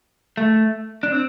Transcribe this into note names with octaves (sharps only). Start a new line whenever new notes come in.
A3
D4
C4